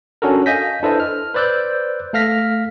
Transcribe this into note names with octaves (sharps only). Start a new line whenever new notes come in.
C#4 D4 F#4 A4 A#4
D#5 F5 G#5 G6 A#6 B6
D4 E4 A4 B4 C5 D#5
F6
B4 C5 D5 E6 F#6 G6
A3 A4 F5 F6 A#6 B6